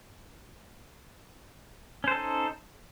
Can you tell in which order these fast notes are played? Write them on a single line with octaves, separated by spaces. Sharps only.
C#4 C5 A4 D#4